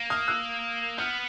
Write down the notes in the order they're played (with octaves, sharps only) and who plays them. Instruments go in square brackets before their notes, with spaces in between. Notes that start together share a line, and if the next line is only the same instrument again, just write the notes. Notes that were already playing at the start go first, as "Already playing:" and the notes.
Already playing: [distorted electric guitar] A#3
[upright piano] D#6 F6
E6 F#6
[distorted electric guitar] B3 [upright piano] F6 G6